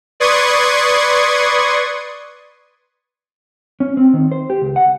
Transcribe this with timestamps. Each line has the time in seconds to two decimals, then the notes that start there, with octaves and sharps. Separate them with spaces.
0.20 B4 D5 C6 C#6 D#6 G#6
3.80 C#4
3.97 C4
4.13 D#3
4.32 C5
4.50 G4
4.62 C#2
4.76 F#5